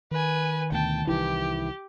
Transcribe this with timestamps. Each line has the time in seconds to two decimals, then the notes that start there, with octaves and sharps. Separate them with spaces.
0.11 D#3 B4 G#5
0.72 D2 B2 G5 A5
1.07 C2 D#3 E3 E4 G4